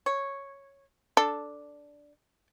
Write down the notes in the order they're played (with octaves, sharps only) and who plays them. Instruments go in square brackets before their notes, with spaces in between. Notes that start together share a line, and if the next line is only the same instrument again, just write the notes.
[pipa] C#5
[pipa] D4 [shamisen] A4